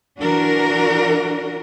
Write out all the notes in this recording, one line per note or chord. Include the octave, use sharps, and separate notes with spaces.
E3 D4 F#4 A#4